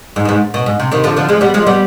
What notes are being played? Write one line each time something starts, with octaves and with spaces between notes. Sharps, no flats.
G#2
B2
G#2
B2
G#2
C3
C3 D#3
D3 F3
D3 F3
F3 G#3
G3 B3
F3 G#3
G3 B3